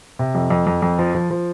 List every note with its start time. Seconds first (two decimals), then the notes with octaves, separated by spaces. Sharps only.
0.19 C3
0.35 F2
0.50 F2
0.67 F2
0.82 F2
0.99 F3
1.15 F3
1.31 F3